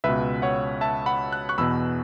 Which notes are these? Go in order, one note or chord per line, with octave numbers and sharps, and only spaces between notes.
C#2 B2 B4 E5
C#5 F#5
E5 A5
F#5 B5
F#6
C#6 F#6
E2 B2 B5 E6